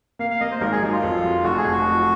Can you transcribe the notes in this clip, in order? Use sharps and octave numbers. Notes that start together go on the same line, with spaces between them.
A#3 F5
F5
A#3 D#5
C5
G#1 A#4
G#4
F#3 D#4
F4
F2
F#3
F1 F#4
G#4
F1
F#4
F2